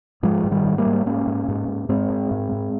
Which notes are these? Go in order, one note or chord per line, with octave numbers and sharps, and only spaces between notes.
G#2 F3 G#3
G#2
D#3 G3
G#2
G3 A#3
G#2
G#2 A#3 C#4
G#2
G#2
G#2
G#2 G#3 C4
G#2
G#2
G#2